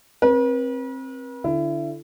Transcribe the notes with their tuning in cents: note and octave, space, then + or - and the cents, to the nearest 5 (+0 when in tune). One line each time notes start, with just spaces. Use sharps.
C4 +20 B4 -45
D3 +0 E4 +30